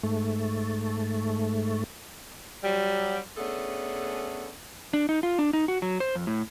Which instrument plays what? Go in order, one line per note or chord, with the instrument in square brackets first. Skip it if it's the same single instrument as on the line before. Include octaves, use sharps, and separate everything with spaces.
[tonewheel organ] G#2 A3
[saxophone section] F#3 G3
A3 B3 C#4 D4 G#4 A4
[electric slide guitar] D4
D#4
F4
D4
D#4
F#4
F#3
C5
F2
A2